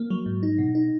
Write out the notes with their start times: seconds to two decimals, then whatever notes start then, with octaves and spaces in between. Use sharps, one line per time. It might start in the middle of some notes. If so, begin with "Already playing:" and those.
Already playing: A#3
0.10 F#3
0.26 G#2
0.43 D#4
0.59 B2
0.75 D#4